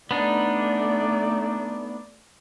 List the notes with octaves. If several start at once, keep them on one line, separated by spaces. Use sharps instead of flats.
A3 B3 D4 D#4 D5